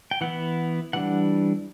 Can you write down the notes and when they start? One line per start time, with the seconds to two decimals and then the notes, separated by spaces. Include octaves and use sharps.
0.11 G5
0.21 E3 B3 E4 F#5
0.93 E3 G3 D4 F#5